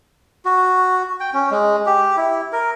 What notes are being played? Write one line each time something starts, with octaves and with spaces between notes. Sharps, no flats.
F#4
G5
C#4
G#3
G4
E4
A#4